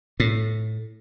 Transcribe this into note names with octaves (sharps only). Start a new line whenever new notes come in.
A2